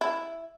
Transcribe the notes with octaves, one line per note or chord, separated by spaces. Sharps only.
E4